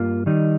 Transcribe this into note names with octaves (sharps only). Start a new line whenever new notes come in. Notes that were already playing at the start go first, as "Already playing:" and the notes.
Already playing: G2 A#3 F4
D#3 G3 D#4